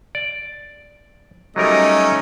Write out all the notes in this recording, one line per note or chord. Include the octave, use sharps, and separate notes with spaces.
D5
F#3 G3 A3 C#4 D#4 A#4 D#5